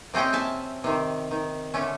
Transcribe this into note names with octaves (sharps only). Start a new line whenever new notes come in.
C3 C4 C#4 D#5 G5
E5 G#5 A5
C3 D#3
D#3
D3 A3 C#4